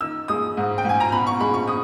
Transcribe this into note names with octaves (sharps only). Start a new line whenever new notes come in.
D#3 E6
G#3 D#6
G#2
G5
G#2 G#5
A#5
B2 B5
C#6
G#3 B5
C#6
D#6